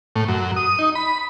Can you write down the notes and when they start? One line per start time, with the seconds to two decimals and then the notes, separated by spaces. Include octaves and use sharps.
0.16 A2
0.28 F#2
0.56 D#6
0.79 D#4
0.95 B5